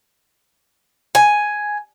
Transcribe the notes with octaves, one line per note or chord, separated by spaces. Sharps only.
G#5